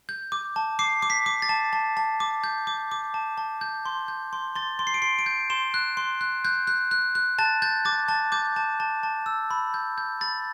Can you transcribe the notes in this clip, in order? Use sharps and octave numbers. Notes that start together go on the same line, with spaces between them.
G6
D6
A5
D6 C7
D6
B6
D6
A6
A5
A5
A5
D6
G6
D6
D6
A5
A5
G6
C6
G6
C6
C6 A6
C6
C7
D7
C6 C7
D7
G6
C6 E7
F#6
C6
F#6
F#6 G6
F#6
F#6
F#6
A5 A6
G6 A6
D6 A6
A5 A6
D6 G6
A5
A5
A5
E6
B5
G6
G6
B5 A6